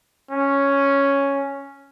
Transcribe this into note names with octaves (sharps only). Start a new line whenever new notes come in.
C#4